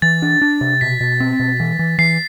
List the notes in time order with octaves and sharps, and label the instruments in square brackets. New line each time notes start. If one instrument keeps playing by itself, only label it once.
[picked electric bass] E3 [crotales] A6
[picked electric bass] D4
D4
C3
[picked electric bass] B2 [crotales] B6
[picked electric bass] B2
C4
B2
E3
E3
[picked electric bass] E3 [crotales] C7